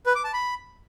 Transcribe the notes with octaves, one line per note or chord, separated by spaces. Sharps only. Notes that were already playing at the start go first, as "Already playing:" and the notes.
B4
D6
A5
B5